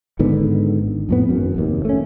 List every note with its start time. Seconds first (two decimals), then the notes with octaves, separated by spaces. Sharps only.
0.19 G#1 G#2 D3 B3
1.09 F2 A2 B3
1.29 G#1 F#2
1.56 F1 D#2
1.85 A3 C#4